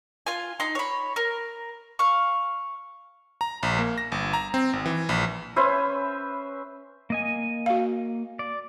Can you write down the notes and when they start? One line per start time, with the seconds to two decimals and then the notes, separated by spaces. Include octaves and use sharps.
0.26 F4 G#5
0.60 D#4 C6
0.75 C#5 B5
1.16 A#4
1.99 F5 C#6
3.41 A#5
3.63 A#1
3.79 A#3
3.98 A#6
4.12 G1
4.33 A#5
4.54 C4
4.73 G#1
4.86 E3
5.09 A#1
5.56 C#4 B4 C5 E5
7.10 A#3 D#5 G#5
7.66 F#4 F5
8.39 D5